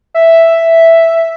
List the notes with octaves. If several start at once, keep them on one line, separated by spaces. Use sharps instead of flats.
E5